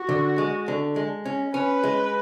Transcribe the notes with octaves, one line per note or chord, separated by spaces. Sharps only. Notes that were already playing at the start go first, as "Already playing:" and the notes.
Already playing: F#4
D3
G#3
D3
G#3
C#4
C#4 B4
G#3